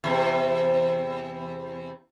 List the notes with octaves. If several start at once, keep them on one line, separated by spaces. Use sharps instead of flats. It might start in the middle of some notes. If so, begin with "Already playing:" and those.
E2 C3